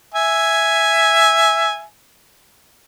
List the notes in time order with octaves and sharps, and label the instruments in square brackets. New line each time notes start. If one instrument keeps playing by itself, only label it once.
[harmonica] E5 G#5